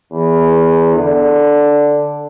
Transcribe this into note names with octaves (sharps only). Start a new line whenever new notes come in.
E2
D3